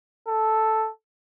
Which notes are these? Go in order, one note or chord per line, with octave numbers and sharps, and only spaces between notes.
A4